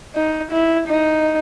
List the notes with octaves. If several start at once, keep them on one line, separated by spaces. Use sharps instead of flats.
D#4
E4
D#4